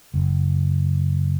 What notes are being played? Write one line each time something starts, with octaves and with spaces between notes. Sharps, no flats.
F#1